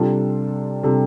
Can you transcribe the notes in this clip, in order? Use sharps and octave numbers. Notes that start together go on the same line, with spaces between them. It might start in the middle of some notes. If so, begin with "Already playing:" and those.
Already playing: C3 G3 D4 F4 A4
C3 G3 D4 F4 A4